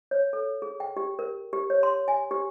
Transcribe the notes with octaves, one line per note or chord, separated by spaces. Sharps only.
C#5
A4
G#4
G5
G4
A#4
G4
C#5
C6
G#5
G4